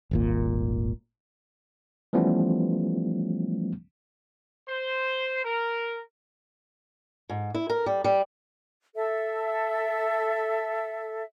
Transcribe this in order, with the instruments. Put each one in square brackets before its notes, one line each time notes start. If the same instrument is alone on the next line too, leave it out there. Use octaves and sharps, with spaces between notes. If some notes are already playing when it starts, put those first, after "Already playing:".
[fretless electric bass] D#1 G#1 A#2
[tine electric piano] E3 F3 G3 A3 B3 C#4
[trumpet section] C5
A#4
[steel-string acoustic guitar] G#2
E4
A#4
G3
G3
[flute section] A4 E5